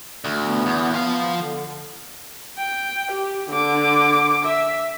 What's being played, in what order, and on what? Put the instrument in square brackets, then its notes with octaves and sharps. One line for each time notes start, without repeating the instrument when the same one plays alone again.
[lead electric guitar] D2
[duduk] B3
[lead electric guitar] E2
[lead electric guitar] F3 F5 [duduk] B3
[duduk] D3
[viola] G5
G4
D3 D6
E5